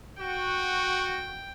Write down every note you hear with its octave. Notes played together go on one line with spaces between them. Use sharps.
F#4 G5